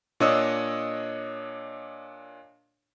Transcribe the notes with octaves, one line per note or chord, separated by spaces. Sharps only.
A#2 D4 C#5 D#5 D#6 E6